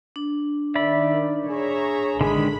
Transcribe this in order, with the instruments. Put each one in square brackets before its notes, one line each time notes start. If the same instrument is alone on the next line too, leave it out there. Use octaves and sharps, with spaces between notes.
[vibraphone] D4
[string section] D#3 [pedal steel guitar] D5 B5 [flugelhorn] E5
[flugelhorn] G#4 [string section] C#5 E5 A#5
[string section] A1 B5 [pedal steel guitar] D3 D#3 G#3 [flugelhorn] G#4